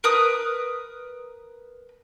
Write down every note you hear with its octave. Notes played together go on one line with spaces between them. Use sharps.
A#4 B4 D#6